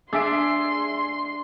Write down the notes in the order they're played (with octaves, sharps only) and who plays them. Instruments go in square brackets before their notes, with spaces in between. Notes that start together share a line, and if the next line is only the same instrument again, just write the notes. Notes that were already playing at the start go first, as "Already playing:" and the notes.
[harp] D4 [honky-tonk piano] G#4 E5 D7 [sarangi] C6